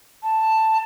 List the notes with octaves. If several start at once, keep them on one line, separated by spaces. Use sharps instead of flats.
A5